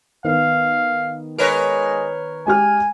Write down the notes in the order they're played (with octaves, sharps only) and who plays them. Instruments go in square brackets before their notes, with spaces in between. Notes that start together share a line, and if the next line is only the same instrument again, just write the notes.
[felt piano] D#3 B3 [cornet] F5
[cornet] G#3 [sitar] A#4 B4 C#5
[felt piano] G#3 G4 F6 [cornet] G#5